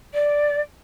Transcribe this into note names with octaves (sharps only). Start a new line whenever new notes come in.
D5